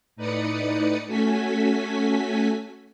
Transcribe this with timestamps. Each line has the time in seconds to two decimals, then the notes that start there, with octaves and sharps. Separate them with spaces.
0.16 A2 D#4 B4 D5 D#6 C#7
1.07 A3 C#4 F#4 A4 G#5 B6